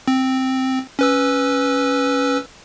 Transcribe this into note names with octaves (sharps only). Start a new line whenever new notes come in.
C4
C#4 B4 E6